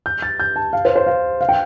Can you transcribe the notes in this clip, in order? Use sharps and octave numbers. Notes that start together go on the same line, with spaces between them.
G6
A6
G6
A5
F5
C5
C5
F5
F5
G5